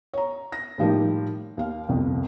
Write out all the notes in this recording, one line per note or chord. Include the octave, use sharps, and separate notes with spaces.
C#5 A#5
A#6
A2 D#3 F3 G3 A#3 D#4
D#2 F5
G1 C2 F2